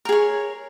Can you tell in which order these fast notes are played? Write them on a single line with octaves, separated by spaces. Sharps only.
A#4 G#4 C#5